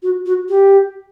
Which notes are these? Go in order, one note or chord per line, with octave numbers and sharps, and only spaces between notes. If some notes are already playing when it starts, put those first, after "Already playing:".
F#4
F#4
G4